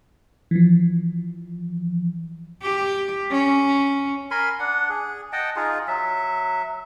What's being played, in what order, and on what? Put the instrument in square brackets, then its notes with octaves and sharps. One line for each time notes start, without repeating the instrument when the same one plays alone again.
[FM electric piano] E3 F3
[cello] G4
C#4
[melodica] A#4 G#5 B5 C6
D4 F#5
G#4
D#5 F#5 G5 A5
D#4 F4 G#4
F#3 E5